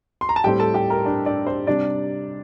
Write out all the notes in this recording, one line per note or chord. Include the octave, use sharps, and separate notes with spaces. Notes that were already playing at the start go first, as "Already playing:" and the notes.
C6
A#5
A5
A2 G3 C4 G4 G5
A4 A5
G4 G5
A#4 A#5
D4 D5
D4 D5
C5
C3 G3 D4 D5